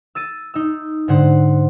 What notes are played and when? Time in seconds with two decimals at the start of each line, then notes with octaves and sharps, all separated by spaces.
0.15 E6 A6 D#7
0.54 D#4 E6
1.08 G#2 D3 C5 F#5